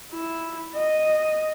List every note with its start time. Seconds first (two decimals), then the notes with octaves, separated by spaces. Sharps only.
0.12 E4
0.75 D#5